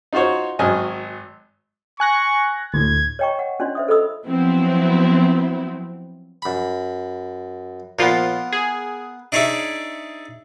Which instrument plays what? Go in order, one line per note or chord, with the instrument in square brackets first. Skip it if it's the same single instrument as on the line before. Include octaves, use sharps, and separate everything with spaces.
[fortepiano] D#4 F4 F#4 C5 C#5
G#1 F#3 D#5 G#5 F6
[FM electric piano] G#5 F#6 A#6 [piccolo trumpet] C#6
[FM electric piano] D2 A2 [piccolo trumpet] G#6
[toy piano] C#5 D#5 G5 A#5 C#6
F#5
C#4 D4 F4 D5 D#5 C6
C5 E5 D#6
A4 C5 D#5 B5 D#6 E6
[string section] F3 F#3 B3 C4 E4
[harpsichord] F#2 B5
[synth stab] A#2 F3 F4 [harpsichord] B3 A#4
[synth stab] G#4
[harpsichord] D4 D#4 G#4 C#5 D5 E5